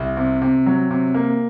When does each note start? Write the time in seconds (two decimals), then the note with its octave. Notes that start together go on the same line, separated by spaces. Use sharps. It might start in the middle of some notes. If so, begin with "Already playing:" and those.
Already playing: C2
0.17 C3
0.42 C3
0.66 F#3
0.91 C3
1.14 A#3